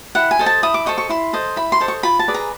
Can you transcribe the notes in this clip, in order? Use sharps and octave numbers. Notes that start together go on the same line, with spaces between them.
E4 F#5
G#5
A4 C5 D#5
A5
E4 D#6
D6
A4 C5 D#5 C#6
C#6
E4 C6
A4 C5 D#5
E4 B5
C6
A4 C5 D#5
C#6
F4 B5
A5
G#4 B4 D5
A#5